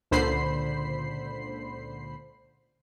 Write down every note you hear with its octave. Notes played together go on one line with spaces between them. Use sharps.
C#2 A#2 D3 C5 B5 C7